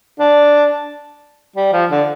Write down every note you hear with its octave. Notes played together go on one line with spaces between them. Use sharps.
D4
G3
F3
D3